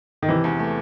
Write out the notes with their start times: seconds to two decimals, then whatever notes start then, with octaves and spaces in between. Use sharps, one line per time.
0.22 D#3
0.28 C3 E3
0.44 E2
0.59 A3